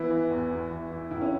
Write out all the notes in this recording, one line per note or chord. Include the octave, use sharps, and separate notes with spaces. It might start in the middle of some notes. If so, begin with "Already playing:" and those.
Already playing: E3 B3 E4
E3
E2
E2
E3
E3
C#2 E4
C#4